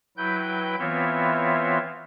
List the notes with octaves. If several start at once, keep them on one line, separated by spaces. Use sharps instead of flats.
F#3 E4 B4 G5 G6
E3 B3 C4 F4 C#5 E5